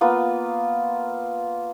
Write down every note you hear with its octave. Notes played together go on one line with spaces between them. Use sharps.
A#3 B3 F4